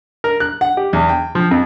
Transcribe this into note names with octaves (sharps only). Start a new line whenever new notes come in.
A#4
F#6
F#5
G4
E2
G5
F3
F2